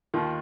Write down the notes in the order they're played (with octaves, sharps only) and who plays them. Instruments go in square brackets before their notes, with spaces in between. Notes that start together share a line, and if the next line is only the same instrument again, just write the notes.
[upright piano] D#2 D#3 F4